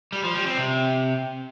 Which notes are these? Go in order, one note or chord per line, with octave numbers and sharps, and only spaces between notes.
G3
F3
G3
C4
C3